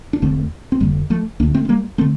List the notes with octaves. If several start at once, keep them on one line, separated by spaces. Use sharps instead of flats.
D4
E1 E2 D3 A3 C4
C4
F1 F2 D3 G3 A#3
F3 A3
D2 D3 A#3 D4
A3 C4
C4
G3 A#3
D3 A3 C4